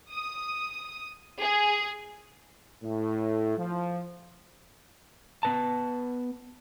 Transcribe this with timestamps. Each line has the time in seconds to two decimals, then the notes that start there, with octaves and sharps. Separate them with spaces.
0.11 D#6
1.40 G#4
2.83 A2
3.57 F3
5.43 B3 B4 A5